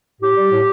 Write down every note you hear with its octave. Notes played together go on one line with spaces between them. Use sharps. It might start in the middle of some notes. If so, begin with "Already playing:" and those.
A2 G4
G3
A2